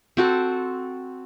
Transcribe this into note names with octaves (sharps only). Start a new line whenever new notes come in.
C4 F#4 A4